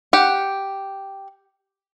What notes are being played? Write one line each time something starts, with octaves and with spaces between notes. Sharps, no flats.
G4 F#5